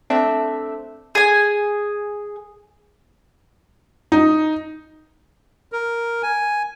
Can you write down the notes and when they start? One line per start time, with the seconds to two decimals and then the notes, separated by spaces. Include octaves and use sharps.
0.10 A3 C4 D4 E5
1.15 G#4 G#5
4.12 D#4
5.72 A#4
6.23 G#5